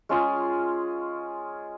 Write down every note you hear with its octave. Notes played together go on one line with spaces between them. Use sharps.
G#3 C#4 F4 G#4